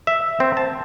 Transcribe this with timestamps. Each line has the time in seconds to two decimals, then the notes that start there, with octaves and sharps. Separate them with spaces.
0.07 E5
0.40 C4
0.57 A5